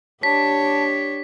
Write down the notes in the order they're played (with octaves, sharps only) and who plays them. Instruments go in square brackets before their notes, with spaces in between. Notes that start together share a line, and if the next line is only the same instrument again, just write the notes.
[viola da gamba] D4 G4 C#5 [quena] A5 [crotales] B6